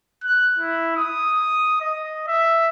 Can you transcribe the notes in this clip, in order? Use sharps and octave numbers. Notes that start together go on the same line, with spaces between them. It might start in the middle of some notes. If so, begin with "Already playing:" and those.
F#6
E4
D#6
D#5
E5